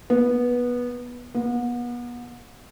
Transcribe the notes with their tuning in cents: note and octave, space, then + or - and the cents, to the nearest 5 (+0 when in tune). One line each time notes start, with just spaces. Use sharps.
B3 -15
B3 -35